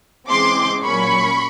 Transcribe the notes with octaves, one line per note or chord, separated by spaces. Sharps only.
C#3 E3 G#3 C4 C6 D6
A#2 F#3 A#3 C#4 B5 C#6